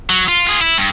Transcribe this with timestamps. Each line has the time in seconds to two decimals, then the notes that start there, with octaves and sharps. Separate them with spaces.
0.09 F#3
0.28 F4
0.47 F4 G#4
0.61 E4
0.78 G2